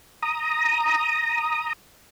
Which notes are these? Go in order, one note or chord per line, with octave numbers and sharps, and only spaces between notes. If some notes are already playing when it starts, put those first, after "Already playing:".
A#5 D#6